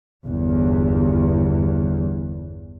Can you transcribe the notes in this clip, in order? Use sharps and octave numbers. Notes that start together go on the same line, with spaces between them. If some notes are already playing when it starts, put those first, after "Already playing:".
G1 E2